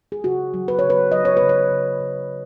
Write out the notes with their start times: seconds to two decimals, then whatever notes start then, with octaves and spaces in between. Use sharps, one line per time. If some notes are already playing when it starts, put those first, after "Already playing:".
0.12 G#4
0.24 C#3 F#4
0.54 F#3
0.68 B4
0.79 C#3 C#5
0.90 B4
1.12 F#3 D#5
1.25 C#5
1.37 C#3 B4
1.49 C#5
1.71 C#3
2.00 C#3